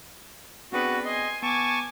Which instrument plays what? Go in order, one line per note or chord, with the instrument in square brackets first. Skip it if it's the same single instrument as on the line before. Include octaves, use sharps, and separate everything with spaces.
[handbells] B3 C4 G#4 [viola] D4 B4 [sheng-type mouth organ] F#4
[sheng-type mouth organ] D#5 [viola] G#5 C6
[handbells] B3 [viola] G#5 D6 [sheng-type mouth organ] A5 C#6